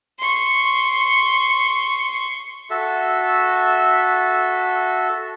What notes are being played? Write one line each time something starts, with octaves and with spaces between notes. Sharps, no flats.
C6 C#6
F#4 A4 E5